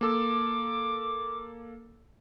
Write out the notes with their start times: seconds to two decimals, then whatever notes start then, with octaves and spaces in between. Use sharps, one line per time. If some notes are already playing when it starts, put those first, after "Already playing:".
0.01 A#3 A4 D6 E6